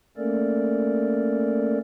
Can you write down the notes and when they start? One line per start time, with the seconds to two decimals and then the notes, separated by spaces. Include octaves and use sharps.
0.17 A3 A#3 C#4 A4 A#4 D5